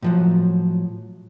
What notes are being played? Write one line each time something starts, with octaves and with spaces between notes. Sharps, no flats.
A2 F3 F#3